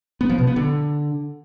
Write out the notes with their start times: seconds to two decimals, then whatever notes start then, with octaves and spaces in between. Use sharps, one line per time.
0.21 B3
0.30 F3
0.38 B2
0.47 B3
0.56 D3